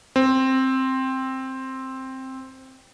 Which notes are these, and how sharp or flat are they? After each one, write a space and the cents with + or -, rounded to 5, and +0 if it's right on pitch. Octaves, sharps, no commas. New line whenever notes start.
C4 +5